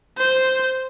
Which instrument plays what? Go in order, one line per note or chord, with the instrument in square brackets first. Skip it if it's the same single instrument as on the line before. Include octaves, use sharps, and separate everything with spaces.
[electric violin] C5